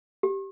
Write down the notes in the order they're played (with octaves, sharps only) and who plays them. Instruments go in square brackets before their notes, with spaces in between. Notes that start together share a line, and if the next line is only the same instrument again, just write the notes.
[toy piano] G4